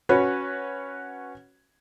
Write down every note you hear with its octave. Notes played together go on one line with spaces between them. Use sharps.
C#4 F#4 B4 C#5